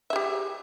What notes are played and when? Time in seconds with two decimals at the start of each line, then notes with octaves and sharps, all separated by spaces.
0.10 E5
0.13 G#4
0.16 G4